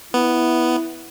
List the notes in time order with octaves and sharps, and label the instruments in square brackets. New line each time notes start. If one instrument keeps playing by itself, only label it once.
[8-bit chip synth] B3 [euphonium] E4